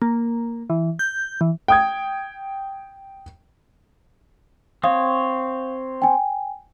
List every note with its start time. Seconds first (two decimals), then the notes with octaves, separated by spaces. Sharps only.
0.02 A#3
0.70 E3
0.99 G6
1.41 E3
1.68 G5 D#6 G#6
4.84 C4 C#5 F5 D#6
6.02 G5 G#5